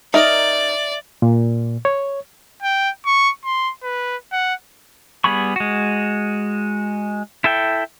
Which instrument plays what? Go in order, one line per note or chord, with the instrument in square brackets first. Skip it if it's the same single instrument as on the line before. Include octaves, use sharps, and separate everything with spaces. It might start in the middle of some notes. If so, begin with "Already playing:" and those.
[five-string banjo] D#4 A#4 [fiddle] D5 [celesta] E5
[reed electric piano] A#2
C#5
[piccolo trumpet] G5
C#6
C6
B4
F#5
[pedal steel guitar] G3 B3 G#4 B5 C#6
G#3 F#4
E4 A4 E5 G5